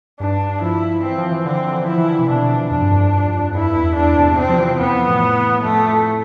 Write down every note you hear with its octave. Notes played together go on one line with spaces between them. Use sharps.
G2 D4
F3 E4
E3 C4
F3
E3
D3 C4
E3
D3
E3
F3 E4
E3
D3
C3
B2 D4
F2 D4
G2
F2
F2
F2
G2 E4
E2
E2 D4
C3
C3 C4
F3
E3
C3
F2 B3
F2
A2
F2 A3
F2